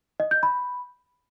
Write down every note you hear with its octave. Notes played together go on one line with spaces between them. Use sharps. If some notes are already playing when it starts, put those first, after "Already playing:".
D#5
G6
B5